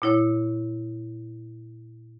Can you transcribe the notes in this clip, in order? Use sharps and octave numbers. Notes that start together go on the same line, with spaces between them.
A#2 E4 C#5